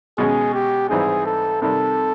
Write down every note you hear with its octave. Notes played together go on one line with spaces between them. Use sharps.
B2 G#3 C#4 G#4
G4
G#2 E3 G3 C4 D#4 G#4
A4
C3 D#3 G3 A4